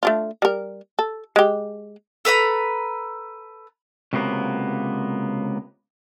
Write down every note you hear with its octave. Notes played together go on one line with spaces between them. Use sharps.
A3 D4 F4
G3 A#4
A4
G#3 G4
A4 B4 A#5 B5
C#2 C3 F#3 A#3 B3